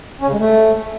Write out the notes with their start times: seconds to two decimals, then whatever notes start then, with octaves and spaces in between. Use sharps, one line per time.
0.21 C#4
0.27 C#3
0.33 G#3
0.39 A3